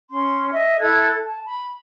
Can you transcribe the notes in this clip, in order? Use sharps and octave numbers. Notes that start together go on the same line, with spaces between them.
C#4 C6
D#5 E5
E4 A4 F#6 G#6
A5
B5